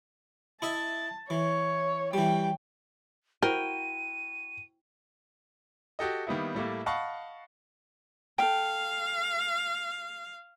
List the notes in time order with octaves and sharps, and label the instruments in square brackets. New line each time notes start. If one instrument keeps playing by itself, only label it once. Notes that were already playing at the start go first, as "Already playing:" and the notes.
[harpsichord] E4 D#5 E5 [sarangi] A5
[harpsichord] E3 [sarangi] C#5
[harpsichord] E3 G3 [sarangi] G5
[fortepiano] E4 F#4 C5 [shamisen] A#4 [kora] G5 [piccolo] D#7
[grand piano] F#4 G4 A4 D#5
D#3 G3 A#3 B3 D#4 E4
A2 G3 A3 A#3
D#5 F5 F#5 A5 B5 C#6
[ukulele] A4 G5 [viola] F5